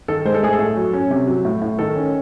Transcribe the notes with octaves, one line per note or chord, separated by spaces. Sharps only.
D#3 A4
G#3 C5
A4
A2 G#4
A4
A2
F#3
C#4
C3
F#3
A2
A2
D#3 A4
C#4